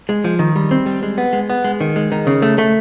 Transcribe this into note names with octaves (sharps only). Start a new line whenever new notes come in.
G#3
F3
D#3
G3
C4
G3
G#3
B3
G#3
B3
G#3
D#3
G#3
D#3
C#3
A3
A3